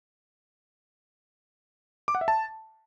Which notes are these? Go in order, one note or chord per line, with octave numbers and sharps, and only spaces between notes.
D6
F#5
E5
A5